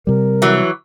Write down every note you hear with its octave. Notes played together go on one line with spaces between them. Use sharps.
C3 G3 A#4
E3 F#3